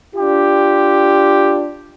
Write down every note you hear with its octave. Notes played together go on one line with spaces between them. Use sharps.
D4 F4 G4